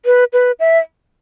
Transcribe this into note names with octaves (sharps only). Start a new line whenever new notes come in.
B4
B4
E5